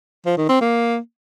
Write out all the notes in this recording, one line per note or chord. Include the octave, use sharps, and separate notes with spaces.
F3
D#3
C4
A#3